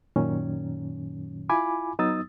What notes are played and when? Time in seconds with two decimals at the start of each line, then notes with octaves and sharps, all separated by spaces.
0.16 F#2 A#2 D#3 F#3 C#4
1.49 E4 F4 G#5 B5 D6
1.99 F#3 B3 D#4 D#6 E6 A6